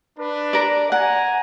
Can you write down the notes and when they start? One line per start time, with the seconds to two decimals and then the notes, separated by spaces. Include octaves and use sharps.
0.18 D4 B4
0.53 A#4 D5
0.92 F#5 G#5 A#5